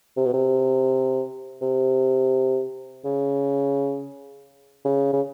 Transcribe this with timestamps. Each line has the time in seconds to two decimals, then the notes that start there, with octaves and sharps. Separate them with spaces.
0.17 C3
0.26 B2
0.33 C3
1.62 C3
3.05 C#3
4.85 C#3
5.13 C#3